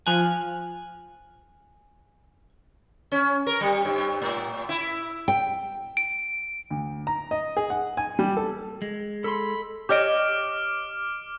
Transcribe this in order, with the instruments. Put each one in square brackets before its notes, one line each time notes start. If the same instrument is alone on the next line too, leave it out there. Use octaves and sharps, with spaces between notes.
[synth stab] F3 F6 F#6 [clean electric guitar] G#5
[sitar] C#4
A#4
G3
G2
A2
E4
[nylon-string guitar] G5
[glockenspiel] D7
[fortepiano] D2
A#5
D#5
G#4
F#5
G#5
G3
A4
[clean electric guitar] G#3
[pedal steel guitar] A4 C6 [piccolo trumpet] B5
[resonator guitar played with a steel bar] G4 C#5 D#5 [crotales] D6 F6 D7